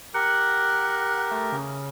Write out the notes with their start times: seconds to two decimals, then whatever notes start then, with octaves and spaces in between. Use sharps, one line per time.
0.14 G4 A#4 F#5
1.31 A3
1.52 C#3